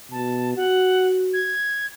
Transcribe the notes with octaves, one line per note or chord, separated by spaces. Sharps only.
B2 A5
F#4 F#5
G#6